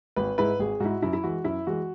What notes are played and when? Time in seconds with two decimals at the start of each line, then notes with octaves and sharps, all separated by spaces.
0.16 G#1 B4
0.38 G#2 G#3 E4 B4
0.59 G#1 G#4
0.80 G#2 G#3 E4 F#4
1.02 F#2 E4
1.13 E4
1.23 E3 G#3 F#4
1.44 F#2 E4
1.67 E3 G#3 F#4